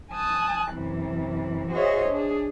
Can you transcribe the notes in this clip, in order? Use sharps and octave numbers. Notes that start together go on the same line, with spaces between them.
G#5 A5 D#6 F#6
F#2 C3 E3
F#4 G#4 C5 C#5 D#5 E5
D4 G#4